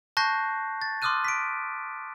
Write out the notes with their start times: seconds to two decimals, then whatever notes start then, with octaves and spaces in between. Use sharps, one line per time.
0.17 A5 C#6 F#6 G6 A#6 C7
0.82 A6
1.02 C6 D6 D#6 F6 F#6 D#7
1.25 B6 D7